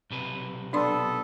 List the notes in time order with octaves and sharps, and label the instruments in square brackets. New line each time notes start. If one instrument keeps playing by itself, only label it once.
[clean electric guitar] B1 C3 B4
[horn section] B3 A4 [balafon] D4 D5 C6